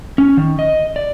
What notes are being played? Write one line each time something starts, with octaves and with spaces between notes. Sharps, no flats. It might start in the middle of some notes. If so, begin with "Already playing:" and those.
C#4
D#3
D#5
D5